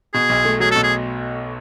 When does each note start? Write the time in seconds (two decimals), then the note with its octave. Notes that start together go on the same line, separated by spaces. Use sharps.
0.14 B2 G#4
0.29 B1
0.45 A3
0.60 F#3 G#4
0.71 B2 A4
0.83 G#4